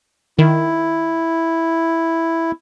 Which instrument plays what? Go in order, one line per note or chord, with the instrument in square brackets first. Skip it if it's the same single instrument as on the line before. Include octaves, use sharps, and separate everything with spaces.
[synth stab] D#3 [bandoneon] E4